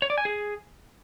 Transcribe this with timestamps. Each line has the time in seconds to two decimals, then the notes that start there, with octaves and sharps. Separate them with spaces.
0.02 C#5
0.10 D5
0.18 G#5
0.25 G#4